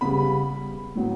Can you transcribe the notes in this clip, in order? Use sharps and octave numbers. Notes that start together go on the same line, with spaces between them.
C#3 G3 B3 B5
A2 F#3 B3